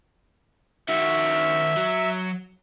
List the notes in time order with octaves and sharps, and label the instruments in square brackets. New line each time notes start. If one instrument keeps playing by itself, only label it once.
[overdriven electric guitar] D#3 F#4 [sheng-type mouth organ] E5
[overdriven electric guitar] F#3